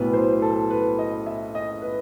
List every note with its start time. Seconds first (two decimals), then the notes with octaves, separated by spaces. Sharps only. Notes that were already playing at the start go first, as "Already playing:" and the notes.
Already playing: B1 A2 F#3 B3 B4
0.13 C5
0.42 A4
0.70 B4
0.99 D#5
1.26 E5
1.55 D#5
1.82 B4